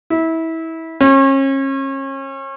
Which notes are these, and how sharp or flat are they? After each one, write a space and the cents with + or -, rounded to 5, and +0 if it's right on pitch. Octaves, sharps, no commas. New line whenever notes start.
E4 -25
C#4 -35